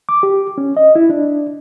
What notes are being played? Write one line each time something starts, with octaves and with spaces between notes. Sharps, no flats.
D6
G4
C#4
D#5
E4
D4